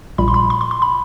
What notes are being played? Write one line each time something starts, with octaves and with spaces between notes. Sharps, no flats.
A#1 A#2 G3 B5
C6
B5
C6
C6
C6
B5